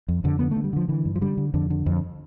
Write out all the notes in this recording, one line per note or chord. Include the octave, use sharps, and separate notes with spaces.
F2
F2 D3
D3 B3
A3
D3
G3
D3 F3
D3 E3
G2
F3
D3 G3
D3
F2 D3
D3
F2